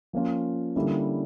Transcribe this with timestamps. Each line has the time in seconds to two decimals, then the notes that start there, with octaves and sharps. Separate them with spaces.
0.13 F3 A#3 C#4 F4
0.76 D3 G3 A#3 C#4 E4